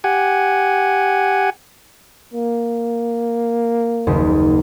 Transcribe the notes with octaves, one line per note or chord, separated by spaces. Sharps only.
G4 F#5 G#5
A#3
F#1 D#2